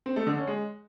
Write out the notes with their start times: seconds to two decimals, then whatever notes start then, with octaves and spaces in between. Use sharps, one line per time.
0.06 C4
0.16 A3
0.27 D3
0.37 C#4
0.47 G#3